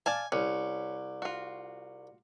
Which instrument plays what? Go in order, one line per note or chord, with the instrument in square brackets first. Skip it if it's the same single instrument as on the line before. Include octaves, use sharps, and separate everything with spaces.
[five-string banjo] D5 F5 A5 [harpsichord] G#5
[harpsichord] C2 [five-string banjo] C#4
[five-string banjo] F4 F#4